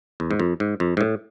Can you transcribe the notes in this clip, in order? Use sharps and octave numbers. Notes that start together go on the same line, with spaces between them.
E2
G#2
F2
G#2
F2
G#2
A2